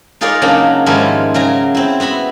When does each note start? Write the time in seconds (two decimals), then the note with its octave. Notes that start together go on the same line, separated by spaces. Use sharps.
0.21 D#4 F4 G#4 A#4 C#5 D5
0.42 C#3 F#3 A#3 D4 D#4
0.86 G#2 D#3 F3 G3 C#4 E4
1.34 C#3 F#3 G#5 A#5
1.75 C4 E4
2.00 B3 F#4 E5 B5